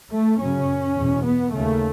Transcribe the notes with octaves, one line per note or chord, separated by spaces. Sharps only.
A3
F#2 C#3 C#4
E2 B2
B3
D#2 C#3 A3